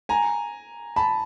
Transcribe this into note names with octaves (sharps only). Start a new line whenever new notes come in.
G#5 A#5
A5 B5